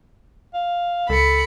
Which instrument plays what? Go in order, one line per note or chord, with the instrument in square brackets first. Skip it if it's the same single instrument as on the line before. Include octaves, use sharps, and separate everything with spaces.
[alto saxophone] F5
[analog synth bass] C#2 [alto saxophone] A4 [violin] B5 C#7